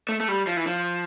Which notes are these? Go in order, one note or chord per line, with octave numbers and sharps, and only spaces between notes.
A3
A3
G3
F3
E3
F3